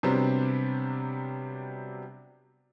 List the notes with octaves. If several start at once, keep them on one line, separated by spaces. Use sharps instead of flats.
C3 F#3 G3 B3 C4 D4